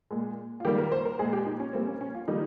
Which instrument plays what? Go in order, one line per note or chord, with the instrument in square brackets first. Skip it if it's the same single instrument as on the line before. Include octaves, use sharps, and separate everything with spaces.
[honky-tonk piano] A#2 G#3
F4
D#3 G3 A#3 G4
A#4
C5
A#4
A#2 G#3 G#4
G4
D#4
C#4
A#2 G3 A#3 C4
C#4
C#4
F4
D#3 G3 A#3 D#4